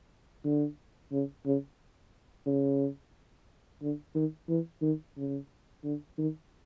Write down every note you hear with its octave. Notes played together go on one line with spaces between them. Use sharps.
D3
C#3
C#3
C#3
D3
D#3
E3
D#3
C#3
D3
D#3